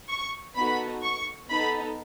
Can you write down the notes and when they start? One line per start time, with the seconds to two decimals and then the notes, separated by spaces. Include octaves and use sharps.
0.09 C#6
0.56 B3 D#4 F#4 A4 B5
1.03 C#6
1.50 B3 D#4 A4 B5